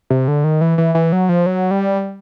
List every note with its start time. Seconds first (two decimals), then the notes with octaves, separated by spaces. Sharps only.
0.10 C3
0.28 D3
0.44 D#3
0.61 E3
0.78 E3
0.95 E3
1.12 F#3
1.29 F3
1.46 F#3
1.71 G3